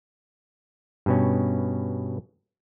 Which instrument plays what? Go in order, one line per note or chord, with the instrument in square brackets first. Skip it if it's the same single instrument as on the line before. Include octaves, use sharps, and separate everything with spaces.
[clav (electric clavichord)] G2 B2 C#4